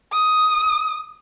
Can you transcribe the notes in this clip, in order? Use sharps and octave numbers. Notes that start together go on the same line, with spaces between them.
D#6